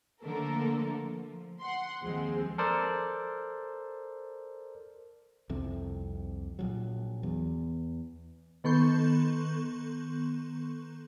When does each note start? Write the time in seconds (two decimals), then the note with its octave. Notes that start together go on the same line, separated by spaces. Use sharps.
0.22 D3 F3 A3 A#3 A4 A#4
1.11 F3
1.61 F#5 C6
2.02 D#2 F3 G#3 C4
2.58 A4 A#4 C5 D5
5.50 C2 F2 C3
6.59 A#1 F#3
7.23 E2
8.64 D#3 B3 A4 C6 C#6 G6